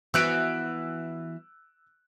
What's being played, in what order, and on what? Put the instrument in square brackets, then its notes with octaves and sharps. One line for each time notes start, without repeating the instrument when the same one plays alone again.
[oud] E3 B3 F#4 [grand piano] E6 F#6 D7